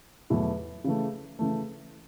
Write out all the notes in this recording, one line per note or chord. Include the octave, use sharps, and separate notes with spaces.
E2 B2 F#3 A3 E4
C#3 E3 A3
C#3 E3 A3